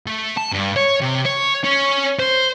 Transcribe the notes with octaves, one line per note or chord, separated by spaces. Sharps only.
A3
A5
G2
C#5
C3
C#5
C#4
C5